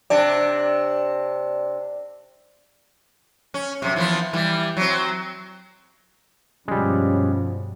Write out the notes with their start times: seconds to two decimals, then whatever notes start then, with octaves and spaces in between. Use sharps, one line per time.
0.10 C3 D4 D5
3.54 C#4
3.82 F#2 C3
3.96 E3 F3 B3
4.33 E3 G3
4.77 F#3 C4
6.68 G2 B2 F3 G3 G#3 C#4